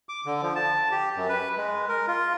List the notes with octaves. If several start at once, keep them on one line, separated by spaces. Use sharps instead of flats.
D6
D3
F3
A5
G4
F#2
B4
G#3
A#4
F4